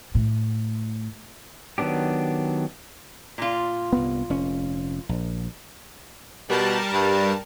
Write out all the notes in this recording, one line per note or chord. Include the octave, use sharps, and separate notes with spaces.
A2
D#3 F#3 B3 D4 G4
A#2 F4
C2 G2 B3
F1 C#4
A#1
B2 G3 A#4 A5
G2